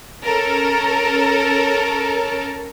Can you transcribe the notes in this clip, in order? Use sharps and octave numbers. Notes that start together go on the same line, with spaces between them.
C#4 A4 A#4